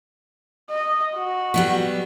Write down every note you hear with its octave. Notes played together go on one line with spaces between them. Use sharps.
D#5
F#4
F#3 G3 B3